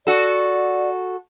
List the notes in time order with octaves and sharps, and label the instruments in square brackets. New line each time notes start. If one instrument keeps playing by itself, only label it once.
[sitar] F#4 A4 [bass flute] D5